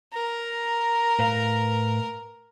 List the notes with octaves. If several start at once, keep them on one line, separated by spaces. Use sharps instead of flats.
A#4 A#5
A2 B4 F5